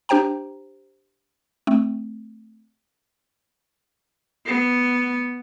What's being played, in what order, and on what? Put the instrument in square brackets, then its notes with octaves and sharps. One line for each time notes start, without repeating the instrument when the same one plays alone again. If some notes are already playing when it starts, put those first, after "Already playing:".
[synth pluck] D4 G4 C5 G5 A#5
A3 C4
[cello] B3